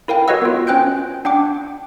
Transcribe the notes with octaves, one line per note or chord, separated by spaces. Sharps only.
E4 A#4 F5 G5
F#4 B4 C#5 D#5 F#5 E6
B3 F4
C#4 C5 G5 F#6 G6 D7
D4 F#5 G5 D6